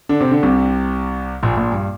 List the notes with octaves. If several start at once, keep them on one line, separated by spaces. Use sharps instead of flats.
D3 D4
C3 C4
D3 D4
C2 C3
A#1 A#2
A#1 A#2
G2